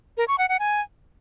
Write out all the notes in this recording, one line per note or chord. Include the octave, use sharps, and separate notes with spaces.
A#4
C#6
F#5
F#5
G#5